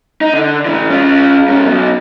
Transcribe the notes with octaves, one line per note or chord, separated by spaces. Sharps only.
D#4
D3
A2 E3
C#4 F4
G#2 C#4
B2 F#3